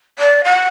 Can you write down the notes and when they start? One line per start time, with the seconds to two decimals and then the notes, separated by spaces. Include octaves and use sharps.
0.19 D5
0.44 F#5